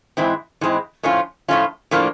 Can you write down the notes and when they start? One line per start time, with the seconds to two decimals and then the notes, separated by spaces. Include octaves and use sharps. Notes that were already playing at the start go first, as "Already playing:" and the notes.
0.17 G#2 E3 G#3 C4 E4
0.61 G#2 E3 G#3 C4 E4
1.03 A2 F3 A3 C#4 F4
1.48 A2 F3 A3 C#4 F4
1.91 A2 F3 A#3 D4